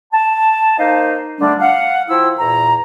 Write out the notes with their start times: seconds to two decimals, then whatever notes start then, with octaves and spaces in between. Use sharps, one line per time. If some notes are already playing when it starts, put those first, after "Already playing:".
0.13 A5
0.78 A#3 D#4 C5 D#5 F5
1.39 D3 G3 A3 D4
1.60 F5 F#5
2.08 F3 E4 G5 E6
2.38 E2 A#2 A#5